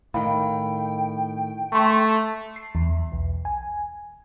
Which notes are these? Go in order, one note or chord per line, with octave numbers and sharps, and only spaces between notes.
A2 D#3 F5 G5 B5
A3 A5 C6 C#6
C7
E2
B1
G#5